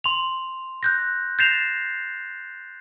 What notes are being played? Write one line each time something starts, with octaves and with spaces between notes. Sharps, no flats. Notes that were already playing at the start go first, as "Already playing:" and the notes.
C6 F7
F#6 G6 A#6
G6 A6 A#6 C7 E7 F7